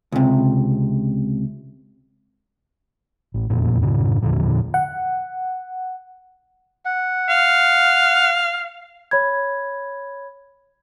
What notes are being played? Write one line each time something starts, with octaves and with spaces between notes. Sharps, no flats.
C#2 C3
A1
E1 F2 A#2
F#2 A2 C#3
E2 A#2 D3 F3
F#5
F#5
F5
C#5 B5 G#6